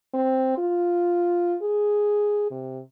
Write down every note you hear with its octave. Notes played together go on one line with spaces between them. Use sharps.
C4
F4
G#4
C3